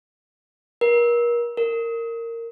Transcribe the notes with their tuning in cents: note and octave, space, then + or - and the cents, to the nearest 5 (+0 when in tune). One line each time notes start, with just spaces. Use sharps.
A#4 +35
A#4 -20